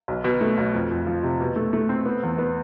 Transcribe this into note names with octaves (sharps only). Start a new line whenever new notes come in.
B1
B2
A3
B1
F2
F2
F3
C3
B2
A3
A3
C4
B3
E2
B3